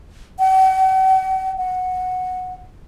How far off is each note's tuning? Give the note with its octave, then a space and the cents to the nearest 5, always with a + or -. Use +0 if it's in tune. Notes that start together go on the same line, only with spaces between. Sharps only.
F#5 +45
F#5 -5